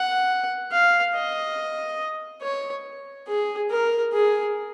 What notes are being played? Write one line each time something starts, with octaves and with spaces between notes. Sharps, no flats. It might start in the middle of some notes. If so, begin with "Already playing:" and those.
Already playing: F#5
F5
D#5
C#5
G#4
A#4
G#4